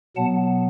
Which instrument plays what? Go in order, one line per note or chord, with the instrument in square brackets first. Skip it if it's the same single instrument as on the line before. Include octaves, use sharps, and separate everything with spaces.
[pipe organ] B2 F#3 B3 F#5 A5